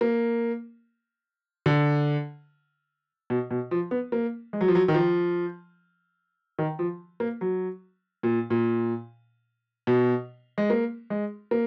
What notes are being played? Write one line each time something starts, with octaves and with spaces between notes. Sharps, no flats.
A#3
D3
B2
B2
F3
B3
A#3
G#3
F#3
F3
F#3
D#3
F3
D#3
F3
A#3
F#3
A#2
A#2
B2
G#3
A#3
G#3
A#3